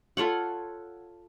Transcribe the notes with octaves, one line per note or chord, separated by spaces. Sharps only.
F4 A4 C#5 F#5